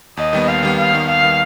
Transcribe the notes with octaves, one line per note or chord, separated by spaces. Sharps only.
D#2 D#5
D#3 G3 B3
D#2 F5
D#3 G3 B3
D#2 F5
D#3 G3 B3
D#2 F5
D#3 G3 B3